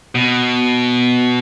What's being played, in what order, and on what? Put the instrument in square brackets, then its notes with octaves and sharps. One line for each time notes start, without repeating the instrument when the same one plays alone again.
[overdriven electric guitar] B2